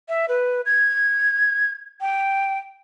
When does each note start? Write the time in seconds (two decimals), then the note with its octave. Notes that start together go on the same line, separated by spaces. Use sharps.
0.09 E5
0.29 B4
0.66 G#6
2.01 G5